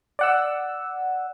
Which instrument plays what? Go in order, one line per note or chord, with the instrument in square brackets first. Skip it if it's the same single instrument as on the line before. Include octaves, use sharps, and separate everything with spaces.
[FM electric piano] D5 F#5 E6